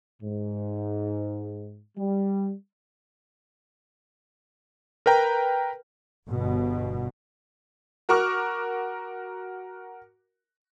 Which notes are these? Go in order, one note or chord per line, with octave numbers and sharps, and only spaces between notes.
G#2
G3
A#4 B4 G5 A#5
G1 B2
F#4 A#4 C#6 D6 F6 F#6